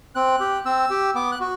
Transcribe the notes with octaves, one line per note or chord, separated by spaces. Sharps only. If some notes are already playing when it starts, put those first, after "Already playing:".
C4 F#6
G4
C4 E6
G4
B3 D6
F#6
F#4